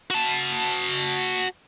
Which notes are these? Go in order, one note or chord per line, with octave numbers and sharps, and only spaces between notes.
F#4 A5